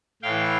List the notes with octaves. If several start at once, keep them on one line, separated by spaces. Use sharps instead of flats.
A2 E3 F5 G5